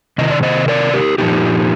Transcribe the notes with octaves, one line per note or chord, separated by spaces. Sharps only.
C3 D#3 D#5
D5
C5 D#5
A#4 D5
G4 A#4
A#2 F3 D#4 G4